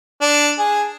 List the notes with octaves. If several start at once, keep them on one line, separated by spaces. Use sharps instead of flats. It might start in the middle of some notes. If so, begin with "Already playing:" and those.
D4
G#4